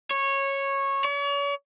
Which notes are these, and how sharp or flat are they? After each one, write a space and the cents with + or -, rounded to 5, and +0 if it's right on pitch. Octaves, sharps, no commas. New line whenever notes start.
C#5 -15
C#5 +40